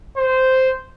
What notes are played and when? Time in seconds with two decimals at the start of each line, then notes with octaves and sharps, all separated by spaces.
0.17 C5